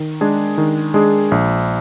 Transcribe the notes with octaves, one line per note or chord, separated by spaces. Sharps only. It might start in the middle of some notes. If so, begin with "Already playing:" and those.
Already playing: D#3
G#3 D4 G#4
D#3
G#3 D4 G#4
A#1